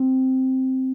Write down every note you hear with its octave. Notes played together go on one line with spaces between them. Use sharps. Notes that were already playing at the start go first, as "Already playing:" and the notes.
Already playing: C4